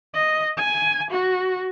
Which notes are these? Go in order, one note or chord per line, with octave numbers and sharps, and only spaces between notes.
D#5
G#5
F#4